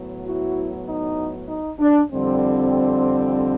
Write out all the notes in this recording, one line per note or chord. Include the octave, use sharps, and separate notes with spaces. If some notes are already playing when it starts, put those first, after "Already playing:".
Already playing: A2 F#3 B3
E4 F#4
D#4
D#4
D4
F2 D3 G3 C4